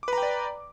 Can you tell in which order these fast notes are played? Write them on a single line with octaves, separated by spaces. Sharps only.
D6 B4 A#5 G5 D5